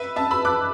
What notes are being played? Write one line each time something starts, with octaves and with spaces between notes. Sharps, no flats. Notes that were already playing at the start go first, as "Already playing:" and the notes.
Already playing: B4 E5
E5 A5
B5 E6
D6 F#6